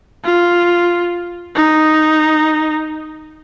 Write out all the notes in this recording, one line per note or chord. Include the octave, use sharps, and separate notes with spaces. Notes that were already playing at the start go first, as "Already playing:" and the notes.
F4
D#4